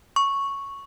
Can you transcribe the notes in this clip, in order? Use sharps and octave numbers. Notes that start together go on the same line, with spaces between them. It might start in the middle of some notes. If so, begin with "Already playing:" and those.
C#6